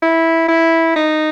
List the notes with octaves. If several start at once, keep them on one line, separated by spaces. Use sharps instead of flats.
E4
E4
D#4